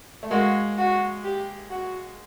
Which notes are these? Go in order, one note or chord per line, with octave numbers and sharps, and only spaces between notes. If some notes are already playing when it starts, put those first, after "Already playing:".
A3
G#3 A#3 F#4
F#4
G4
F#4